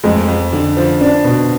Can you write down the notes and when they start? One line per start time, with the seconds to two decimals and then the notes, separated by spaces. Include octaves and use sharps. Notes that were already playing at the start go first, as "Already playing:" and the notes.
0.04 F2 G#3
0.28 F2
0.53 D3
0.77 F3
1.01 D4
1.24 B2